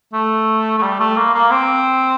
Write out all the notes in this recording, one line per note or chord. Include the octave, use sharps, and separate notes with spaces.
A3
A3
G3
A3
A#3
A#3
C4